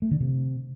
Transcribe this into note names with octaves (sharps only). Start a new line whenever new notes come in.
A3
D3
C3